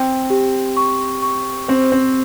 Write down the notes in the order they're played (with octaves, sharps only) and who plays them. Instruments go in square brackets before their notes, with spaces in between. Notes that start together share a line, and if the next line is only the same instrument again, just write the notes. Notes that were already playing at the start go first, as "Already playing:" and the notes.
Already playing: [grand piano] C4 [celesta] G5
[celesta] G4
C#6
C#6
[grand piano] C4 [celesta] C5
[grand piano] C4